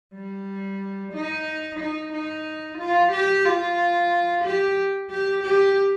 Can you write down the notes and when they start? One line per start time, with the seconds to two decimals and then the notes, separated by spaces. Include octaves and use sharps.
0.14 G3
1.13 D#4
1.80 D#4
2.13 D#4
2.79 F4
3.13 G4
3.45 F4
4.44 G4
5.10 G4
5.44 G4